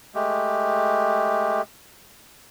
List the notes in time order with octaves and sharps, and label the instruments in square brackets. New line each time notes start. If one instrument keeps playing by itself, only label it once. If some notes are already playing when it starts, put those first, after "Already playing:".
[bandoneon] G#3 A3 G4